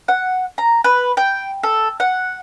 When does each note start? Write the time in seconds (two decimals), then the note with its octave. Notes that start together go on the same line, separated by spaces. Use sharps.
0.08 F#5
0.58 A#5
0.84 B4
1.17 G5
1.63 A4
2.00 F#5